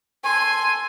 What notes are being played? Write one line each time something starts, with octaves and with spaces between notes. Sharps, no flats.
A4 G#5 C6